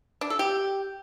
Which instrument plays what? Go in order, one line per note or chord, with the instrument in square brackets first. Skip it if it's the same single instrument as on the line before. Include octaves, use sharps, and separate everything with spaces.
[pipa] D4
A4
G4